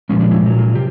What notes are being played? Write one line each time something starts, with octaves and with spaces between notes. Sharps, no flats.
A#2 F3 G#3 C#4
D4
E4
A#2 F#3
F4
C3 G4